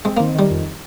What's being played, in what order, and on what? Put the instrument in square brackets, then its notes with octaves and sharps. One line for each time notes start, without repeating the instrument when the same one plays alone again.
[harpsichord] G#3 [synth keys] C4
[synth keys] D#3 [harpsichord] A#3
[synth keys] D#3 [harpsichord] G3
[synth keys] F2